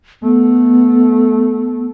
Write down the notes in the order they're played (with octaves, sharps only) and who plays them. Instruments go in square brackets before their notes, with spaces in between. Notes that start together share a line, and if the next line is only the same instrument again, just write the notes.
[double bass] A3 [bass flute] B3